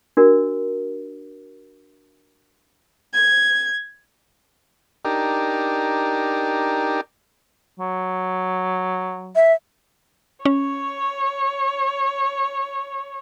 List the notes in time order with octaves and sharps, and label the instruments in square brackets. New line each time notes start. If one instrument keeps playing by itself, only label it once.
[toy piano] D4 F#4 A#4
[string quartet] G#6
[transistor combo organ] D4 D#4 G4 A#4
[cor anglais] F#3
[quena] E5
[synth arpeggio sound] C#4 [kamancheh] C#5